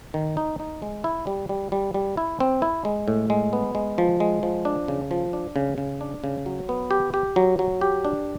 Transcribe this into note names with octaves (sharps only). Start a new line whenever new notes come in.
D#3
D#4
D#4
G#3
E4
G3
G3
G3
G3
E4
C4
E4
G#3
A2
G#3
B3
G#3
F3
G#3
F3
D4
C#3
F3
D4
C#3
C#3
D4
C#3
F#3
B3
G4
G4
F#3
F#3
G4
D4